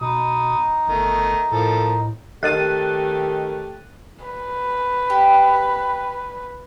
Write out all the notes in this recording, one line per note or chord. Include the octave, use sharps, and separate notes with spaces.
B2 D#4 B5 D#6
G1 D#3 A3
A2 F3 A#3 A4
D#3 A3 C4 G4 D#5 F#6 A6 D#7
B4
G4